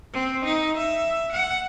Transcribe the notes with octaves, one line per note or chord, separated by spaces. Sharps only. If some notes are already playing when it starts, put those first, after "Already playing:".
C4
D#4
E5
F#5